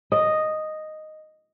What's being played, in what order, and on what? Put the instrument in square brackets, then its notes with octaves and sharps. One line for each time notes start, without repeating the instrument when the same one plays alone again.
[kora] D#5